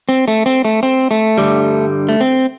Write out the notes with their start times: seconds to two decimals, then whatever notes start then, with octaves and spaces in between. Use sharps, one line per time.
0.09 C4
0.28 A3
0.46 C4
0.65 A3
0.83 C4
1.11 A3
1.38 G2 D3 G3
2.09 A3
2.21 C4